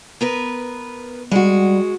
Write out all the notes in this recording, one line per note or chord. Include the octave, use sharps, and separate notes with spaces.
B3 A#4 B4
G3 G#3 F#4